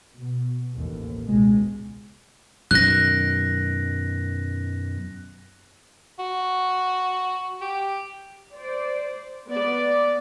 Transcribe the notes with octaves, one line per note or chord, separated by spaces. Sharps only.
B2
A1 D#2
C#2 B2 G#3
F#2 B2 D#3 F#6 A#6
F#4
G4
C5 D5
B3 D5